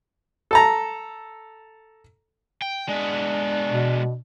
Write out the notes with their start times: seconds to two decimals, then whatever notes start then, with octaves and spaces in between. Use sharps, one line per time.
0.51 A4 A5 A#5
2.61 G5
2.89 G#3 B3 D4
3.71 B2